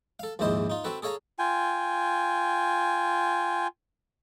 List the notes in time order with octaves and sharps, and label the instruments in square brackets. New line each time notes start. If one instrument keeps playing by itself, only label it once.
[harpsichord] A4 F5
A#1 D#2 G#2 E4 C5 D#5
D#4 F4
C4 F#4 A4 B4
G#4 A4 C#5 F5 G#5 A#5
[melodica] F4 G5 G#5